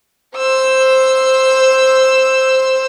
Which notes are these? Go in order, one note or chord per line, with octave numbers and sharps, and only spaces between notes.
C5 E6